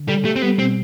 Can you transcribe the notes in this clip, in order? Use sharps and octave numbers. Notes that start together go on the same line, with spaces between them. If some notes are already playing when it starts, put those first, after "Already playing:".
Already playing: D3
G3 A4
A3 G4
C4
G3 B3
B2 C4